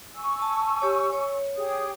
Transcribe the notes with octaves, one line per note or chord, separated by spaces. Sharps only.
G#5 C#6 E6
A5
G4 C#5
C#5
G4 G#4 D#6